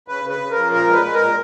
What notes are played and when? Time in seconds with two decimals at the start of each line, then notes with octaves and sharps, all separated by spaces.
0.08 C#3 B4
0.24 C#3
0.30 B4
0.40 C#3
0.51 F3 A#4
0.72 A#2 A#4
0.87 G#3
0.93 B4
1.04 G#3
1.14 A#4
1.19 A#2